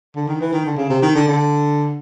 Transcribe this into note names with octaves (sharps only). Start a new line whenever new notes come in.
D3
D#3
E3
D#3
D3
C#3
C3
D#3
D3
D3